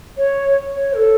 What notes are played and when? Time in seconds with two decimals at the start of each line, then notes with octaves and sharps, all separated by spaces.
0.17 C#5
0.76 C#5
0.96 A4